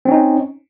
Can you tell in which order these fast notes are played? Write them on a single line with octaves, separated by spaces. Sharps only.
C4 C#4 D#4